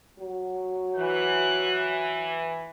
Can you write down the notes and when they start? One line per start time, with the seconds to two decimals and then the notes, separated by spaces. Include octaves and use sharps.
0.19 F#3
0.97 E3 F#6